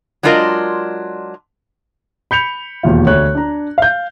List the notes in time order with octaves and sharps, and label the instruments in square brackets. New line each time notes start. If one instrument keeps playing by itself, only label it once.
[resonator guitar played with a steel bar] F#3 G#3 D4 F4 A#4 D#5
[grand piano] B5 G6 C#7 F7
E1 D#2 F4
D2 C#5 F#6
D4 A#5
F5 G6